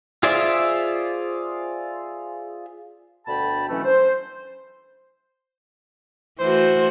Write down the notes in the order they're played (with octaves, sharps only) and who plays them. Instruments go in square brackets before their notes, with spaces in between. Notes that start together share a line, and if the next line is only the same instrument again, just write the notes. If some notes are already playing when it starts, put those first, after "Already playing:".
[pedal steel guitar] F4 G#4 C5 D5 E5
[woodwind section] D2 B2 D3 G5 A5 B5
B2 D3 E3 F#3 A3 C#4
C5
[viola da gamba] E3 A3 F#4 [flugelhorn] C5